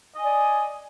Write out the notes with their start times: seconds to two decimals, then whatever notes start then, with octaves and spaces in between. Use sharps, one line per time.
0.15 D#5
0.20 G#5
0.25 D5